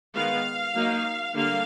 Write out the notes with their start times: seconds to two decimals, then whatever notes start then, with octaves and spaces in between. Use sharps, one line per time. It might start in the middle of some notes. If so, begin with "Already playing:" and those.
0.15 D#3 G#3 B3 F5
0.75 F#3 A#3 D#4
1.35 D3 G3 A#3 F5